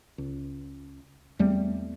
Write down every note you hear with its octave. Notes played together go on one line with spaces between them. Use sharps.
C#2
E2 G3 A3 C4